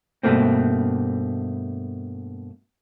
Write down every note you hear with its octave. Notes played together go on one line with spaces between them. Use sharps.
G2 B2 A3 A#3 C4